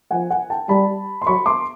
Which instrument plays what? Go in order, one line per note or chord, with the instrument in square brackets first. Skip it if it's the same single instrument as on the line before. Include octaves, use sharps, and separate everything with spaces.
[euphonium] F3 [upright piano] F#5 G#5
[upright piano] F#5 G#5
G5 A5
[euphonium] G3 [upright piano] A5 B5
[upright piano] C6
[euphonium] F#3 [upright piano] B5 C#6
[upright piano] C6 D6